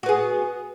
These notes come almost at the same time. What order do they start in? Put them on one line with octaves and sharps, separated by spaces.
F#4 B3 G#4